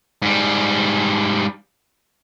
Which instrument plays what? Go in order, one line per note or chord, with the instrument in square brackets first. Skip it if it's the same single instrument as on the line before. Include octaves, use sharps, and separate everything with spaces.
[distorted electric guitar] G#2 G3